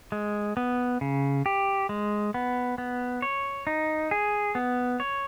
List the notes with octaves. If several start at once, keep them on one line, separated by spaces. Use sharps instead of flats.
G#3
B3
C#3
G4
G#3
B3
B3
C#5
D#4
G#4
B3
C#5